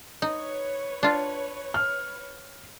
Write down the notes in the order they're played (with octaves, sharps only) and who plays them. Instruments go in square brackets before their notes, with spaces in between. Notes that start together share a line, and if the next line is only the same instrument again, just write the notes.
[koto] D#4 [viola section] B4 C#5
[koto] D4 F4
[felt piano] F6